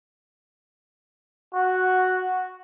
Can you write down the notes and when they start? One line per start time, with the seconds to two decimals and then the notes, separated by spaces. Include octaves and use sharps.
1.54 F#4